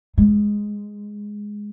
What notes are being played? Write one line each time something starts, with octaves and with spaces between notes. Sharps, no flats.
G#3